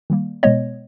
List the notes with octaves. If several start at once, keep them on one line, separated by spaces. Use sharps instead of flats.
D#3 G3 A#3
B2 G#3 B3 C#5 D#5